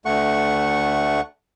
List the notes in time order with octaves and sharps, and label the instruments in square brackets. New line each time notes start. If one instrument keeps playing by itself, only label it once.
[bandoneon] D2 A3 F#5 C#6